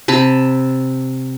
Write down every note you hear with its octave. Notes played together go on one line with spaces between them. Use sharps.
C3 A5 B5